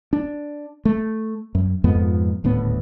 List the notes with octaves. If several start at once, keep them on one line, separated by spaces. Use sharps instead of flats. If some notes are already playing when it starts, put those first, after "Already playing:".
D4
A3
F#2
F2 G#2 F3 B3
D#1 D2 A2 B3